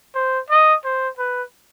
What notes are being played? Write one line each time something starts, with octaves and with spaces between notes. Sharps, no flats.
C5
D#5
C5
B4